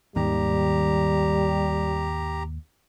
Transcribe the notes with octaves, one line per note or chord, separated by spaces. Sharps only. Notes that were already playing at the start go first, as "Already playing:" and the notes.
D#2 G#2 D#3 G3 G4 A#5